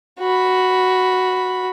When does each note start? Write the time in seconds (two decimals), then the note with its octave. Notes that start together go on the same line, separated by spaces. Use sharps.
0.20 F#4 B5